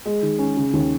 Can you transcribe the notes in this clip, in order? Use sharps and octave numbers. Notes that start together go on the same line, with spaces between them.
G#3
D#3
C#4
C#3
D#2